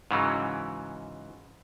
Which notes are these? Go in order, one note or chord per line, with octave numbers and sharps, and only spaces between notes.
G#2 C#3 E3 F#3